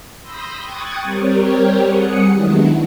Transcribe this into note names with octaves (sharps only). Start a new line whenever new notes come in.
B5 C6 D#6 E6 G6 A#6
G5 C#6 D#6 F#6 G#6 A6
G3 C4 G4 A#4 C#5
G3 G#4 F#5 D#6 C#7
D#3 F#3 G#3 B3 D4 E4